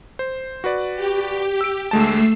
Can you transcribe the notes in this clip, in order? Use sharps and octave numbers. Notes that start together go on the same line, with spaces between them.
C5
F#4 B4 D5
G4
E6 D7
D2 G#3 A3 A5 E6 C7